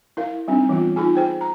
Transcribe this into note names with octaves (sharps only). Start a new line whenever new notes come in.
E4 A#4 F5
G3 C4 D4 D#4
E3 G3 B3 F4
D#4 F4 G#4 G#5
G#4 C5 G5
A#5